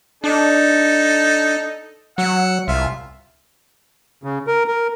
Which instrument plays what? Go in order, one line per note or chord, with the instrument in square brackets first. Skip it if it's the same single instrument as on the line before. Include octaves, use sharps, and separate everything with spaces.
[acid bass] D4 [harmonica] D#4 A4
[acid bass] F#3 [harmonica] F#5 E6
[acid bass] C2 [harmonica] F4 E5
[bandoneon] C#3
A#4
A#4